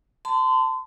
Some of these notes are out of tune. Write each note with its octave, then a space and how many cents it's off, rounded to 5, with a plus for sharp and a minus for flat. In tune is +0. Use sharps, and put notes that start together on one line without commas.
A5 +25 C6 -35